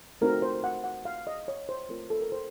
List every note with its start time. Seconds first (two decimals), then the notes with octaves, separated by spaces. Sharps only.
0.21 A3 C4 D#4 F#4 A#4
0.42 C5
0.64 F#5
0.84 F#5
1.05 F5
1.27 D#5
1.48 C#5
1.69 C5
1.89 A3 C4 F4 A#4
2.10 A4
2.21 A#4
2.32 C5